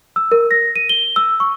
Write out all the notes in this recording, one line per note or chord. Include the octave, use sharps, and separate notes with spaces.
E6
A#4
A#6
D#7
G7
E6
C#6